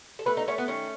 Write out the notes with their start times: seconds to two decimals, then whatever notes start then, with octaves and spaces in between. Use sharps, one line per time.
0.19 A4
0.26 A3 B4
0.37 D#4
0.48 A3 C#4
0.58 B3
0.68 D#3 C#4